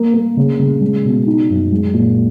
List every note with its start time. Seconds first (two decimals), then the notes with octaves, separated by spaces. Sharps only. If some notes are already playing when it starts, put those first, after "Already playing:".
Already playing: A#3
0.14 A#3
0.37 C#3
0.59 C#3
0.81 G#3
1.04 B2
1.26 D#4
1.50 F#2
1.71 G#3
1.93 A#2